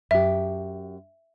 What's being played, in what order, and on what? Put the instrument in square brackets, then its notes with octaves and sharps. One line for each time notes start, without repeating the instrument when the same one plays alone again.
[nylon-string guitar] F#2 G4 [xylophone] E5